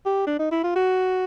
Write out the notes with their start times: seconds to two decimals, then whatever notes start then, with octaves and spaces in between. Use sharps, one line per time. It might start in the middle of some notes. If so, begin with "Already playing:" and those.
0.06 G4
0.27 D4
0.39 D#4
0.51 E4
0.64 F4
0.76 F#4